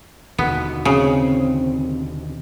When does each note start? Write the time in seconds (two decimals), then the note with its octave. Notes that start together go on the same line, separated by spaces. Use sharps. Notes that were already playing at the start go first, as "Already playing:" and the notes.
0.38 D#2 B2 D3 B3
0.85 C#3 C4